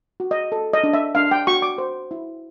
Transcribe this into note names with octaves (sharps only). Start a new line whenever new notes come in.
F#4
D#5
A4
D#5
D4
E5
D4 F5
G5
F#4 C#6
D6
C5
E4